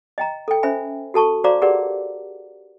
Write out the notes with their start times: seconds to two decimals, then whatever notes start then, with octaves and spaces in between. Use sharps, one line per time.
0.18 D#5 G5 A#5
0.48 A4 G5
0.63 C#4 C5 E5 G#5 B5
1.14 F#4 A4 A5 C#6
1.44 F#4 C5 D5 F5 A#5 D6
1.62 G4 G#4 A#4 B4 D5 F#5